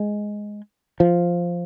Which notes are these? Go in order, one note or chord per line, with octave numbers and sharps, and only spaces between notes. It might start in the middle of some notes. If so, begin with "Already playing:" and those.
Already playing: G#3
F3